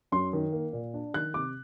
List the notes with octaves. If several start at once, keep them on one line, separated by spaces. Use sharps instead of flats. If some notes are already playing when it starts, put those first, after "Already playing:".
F#2 C6
D#3
A#3
A#2
D4
D#3 F#6
C3 D6